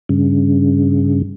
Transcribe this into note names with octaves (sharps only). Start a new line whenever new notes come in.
G2 C#3